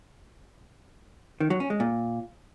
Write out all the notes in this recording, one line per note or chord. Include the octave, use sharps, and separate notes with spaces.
D#3
F#3
C#4
G#3
A#2